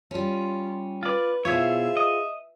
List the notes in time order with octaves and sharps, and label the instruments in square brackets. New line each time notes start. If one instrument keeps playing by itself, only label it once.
[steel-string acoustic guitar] G3 C#4 [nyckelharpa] F4
[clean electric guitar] F4 D5 [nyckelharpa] B4
[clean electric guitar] B2 E4 C#5 [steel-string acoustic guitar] F4 G#4 C5 [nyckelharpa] E5
[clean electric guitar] D#5